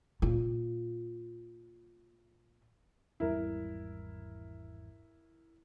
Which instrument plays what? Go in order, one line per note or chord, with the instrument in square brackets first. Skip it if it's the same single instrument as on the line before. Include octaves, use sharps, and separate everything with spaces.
[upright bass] A#2 F4
[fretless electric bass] G#1 E2 G3 [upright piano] E4 A#4